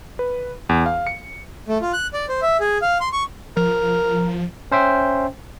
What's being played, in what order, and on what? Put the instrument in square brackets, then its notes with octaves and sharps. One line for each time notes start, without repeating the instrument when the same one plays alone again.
[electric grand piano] B4
E2
F5
C#7
[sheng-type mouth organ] A3
F4
F#6
D5
C5
E5
G#4
F5
C6
C#6
[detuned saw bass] F3 [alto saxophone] A#4
[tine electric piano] C#4 C5 E5 G5